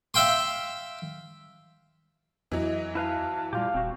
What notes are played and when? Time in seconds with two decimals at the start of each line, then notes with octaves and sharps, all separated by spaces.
0.14 E5 F5 G5 C6
2.52 F2 E3 F#3 D#5
2.95 E4 B4 F5 A5
3.53 A#2 G3 F4 G4 F5
3.74 D#1 C4 F#4